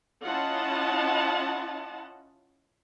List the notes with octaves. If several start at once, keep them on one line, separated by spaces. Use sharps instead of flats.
C#4 E4 F4 D#5 F#5 A5